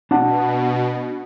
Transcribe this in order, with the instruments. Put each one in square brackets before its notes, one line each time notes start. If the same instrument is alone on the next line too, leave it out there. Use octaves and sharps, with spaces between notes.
[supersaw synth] B2 [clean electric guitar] D4 F#5 A5